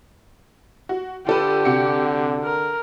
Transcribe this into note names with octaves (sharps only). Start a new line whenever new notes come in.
F#4
D3 F4 G4 A4 B4
C3 F#4 C#7
A#4